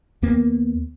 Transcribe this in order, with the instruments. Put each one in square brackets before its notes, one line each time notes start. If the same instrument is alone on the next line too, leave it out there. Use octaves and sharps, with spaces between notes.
[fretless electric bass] D#2 A#3 B3